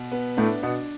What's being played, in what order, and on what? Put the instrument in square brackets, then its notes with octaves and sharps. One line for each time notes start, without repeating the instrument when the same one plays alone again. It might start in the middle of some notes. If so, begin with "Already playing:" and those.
Already playing: [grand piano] B2
B3
[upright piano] A2 A3 [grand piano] D4
[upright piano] B2 B3 [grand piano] D4